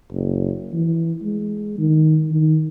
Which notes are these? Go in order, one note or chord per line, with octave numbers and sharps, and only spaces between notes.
F#1
E3
G#3
D#3
D#3